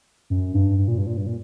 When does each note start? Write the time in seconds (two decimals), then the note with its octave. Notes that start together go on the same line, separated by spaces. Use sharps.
0.30 F#2
0.54 G2
0.78 G2
0.88 A#2
0.98 G2
1.07 A#2
1.17 G2
1.27 A#2